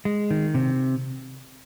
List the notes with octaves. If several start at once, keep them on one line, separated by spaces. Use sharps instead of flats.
G#3
D#3
C3